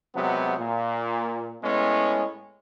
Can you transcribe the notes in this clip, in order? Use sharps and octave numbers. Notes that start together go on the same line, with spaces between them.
C3 F#3 G#3 B3
A#2
A2 G#3 B3 C#4